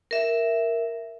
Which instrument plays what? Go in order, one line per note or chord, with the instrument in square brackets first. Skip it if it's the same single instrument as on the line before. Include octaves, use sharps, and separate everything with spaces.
[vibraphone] A#4 E5